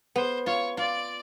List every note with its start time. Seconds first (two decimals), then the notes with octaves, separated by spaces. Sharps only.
0.16 B3 C5
0.46 F4 C#5
0.77 F4 D5